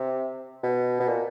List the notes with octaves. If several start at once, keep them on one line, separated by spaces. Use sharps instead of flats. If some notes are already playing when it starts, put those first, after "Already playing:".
Already playing: C3
B2
B2
A#2